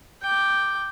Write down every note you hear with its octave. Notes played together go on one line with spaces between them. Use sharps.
G5 D6